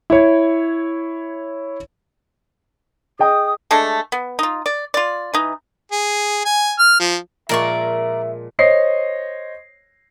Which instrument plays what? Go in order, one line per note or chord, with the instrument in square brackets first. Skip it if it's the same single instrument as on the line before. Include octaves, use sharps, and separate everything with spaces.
[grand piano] E4 C#5
[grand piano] G#4 D#5 G5 [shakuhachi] D#6
[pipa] G#3 A3 D4 A4
B3
D#4 F4
D5
F4 D5
E3 D#4
[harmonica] G#4
G#5
F6
F3
[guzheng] A#2 F3 G#3 [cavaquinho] A#4 D5 C#6 [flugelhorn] E5
[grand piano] C5 C#5 D#5 C7